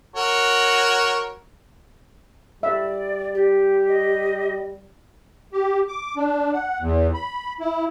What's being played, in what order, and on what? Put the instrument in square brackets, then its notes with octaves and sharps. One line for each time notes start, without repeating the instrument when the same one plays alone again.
[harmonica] F#4 A#4 C#5
[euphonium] G3 [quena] D5 [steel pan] E5
[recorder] G4
[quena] D#5
[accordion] G4
D6
D4
F#5
E2
B5
E4